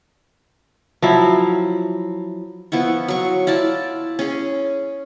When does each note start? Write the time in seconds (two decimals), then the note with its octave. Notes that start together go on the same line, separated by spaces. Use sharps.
1.02 F3 F#3 E4
2.72 F3 B3 E4 C#6
3.08 F#3 C#6
3.47 E4 F4 D5 A5
4.19 C#4 G#4